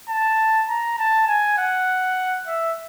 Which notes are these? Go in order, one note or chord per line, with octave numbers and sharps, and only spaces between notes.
A5
A#5
A5
G#5
F#5
E5